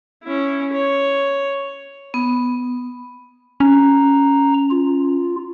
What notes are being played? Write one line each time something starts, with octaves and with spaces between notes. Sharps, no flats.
C#4 E4
C#5
B3
C#4 A#5
F4